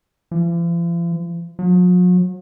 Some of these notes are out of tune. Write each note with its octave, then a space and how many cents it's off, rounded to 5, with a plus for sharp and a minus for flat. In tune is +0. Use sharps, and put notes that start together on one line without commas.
F3 -45
F#3 -45